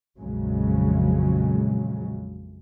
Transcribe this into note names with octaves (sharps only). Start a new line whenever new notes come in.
A#1 F2 C#3 F#3 G#3